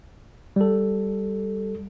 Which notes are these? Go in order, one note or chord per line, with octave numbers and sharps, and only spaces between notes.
G3 A4